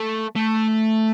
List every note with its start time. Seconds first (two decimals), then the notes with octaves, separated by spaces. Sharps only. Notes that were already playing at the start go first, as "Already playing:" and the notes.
Already playing: A3
0.36 A3